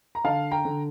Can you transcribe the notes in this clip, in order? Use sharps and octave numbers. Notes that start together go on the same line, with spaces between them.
A#5
D3 F5 A5
G5 A#5
D3